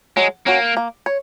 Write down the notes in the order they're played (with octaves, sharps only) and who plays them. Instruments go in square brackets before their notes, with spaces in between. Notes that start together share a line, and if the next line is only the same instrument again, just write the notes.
[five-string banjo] F#3 [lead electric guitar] G#3
[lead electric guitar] A#3 [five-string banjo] C#4 F#4
[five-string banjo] A#3
C#5